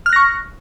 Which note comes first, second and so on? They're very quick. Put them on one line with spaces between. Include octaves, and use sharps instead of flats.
F6 F#6 A#6 C#6